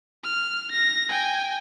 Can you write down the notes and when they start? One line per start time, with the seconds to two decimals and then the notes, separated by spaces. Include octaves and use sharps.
0.24 F6
0.72 A#6
1.09 G5 G#5